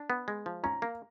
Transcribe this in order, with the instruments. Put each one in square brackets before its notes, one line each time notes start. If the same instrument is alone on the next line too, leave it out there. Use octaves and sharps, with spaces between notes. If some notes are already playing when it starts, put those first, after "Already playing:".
Already playing: [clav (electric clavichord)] D4
B3
G#3
F3
[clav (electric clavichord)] C#4 [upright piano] A#5
[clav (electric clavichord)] A#3